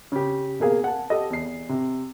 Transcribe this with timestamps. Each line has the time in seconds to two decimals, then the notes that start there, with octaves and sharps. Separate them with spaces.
0.12 C#3 G4
0.60 B2 A#3 G#4 F5
0.84 F#5 A5
1.10 G4 A4 D#5
1.30 E2 C7
1.69 C3